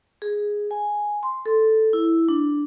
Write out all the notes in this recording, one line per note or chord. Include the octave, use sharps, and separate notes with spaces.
G#4
G#5
C6
A4
E4
D4